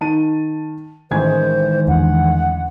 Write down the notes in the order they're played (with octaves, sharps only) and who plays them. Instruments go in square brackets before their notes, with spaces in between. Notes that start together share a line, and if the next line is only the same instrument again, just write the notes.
[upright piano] D#3 A5 D#7
[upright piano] A1 G#5 G#6 [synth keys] D#3 E3 G#3 [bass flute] C5
[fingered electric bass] E2 D3 [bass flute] F#5